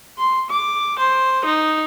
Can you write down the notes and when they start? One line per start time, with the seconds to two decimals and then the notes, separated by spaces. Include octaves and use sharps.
0.18 C6
0.50 D6
0.99 C5
1.45 D#4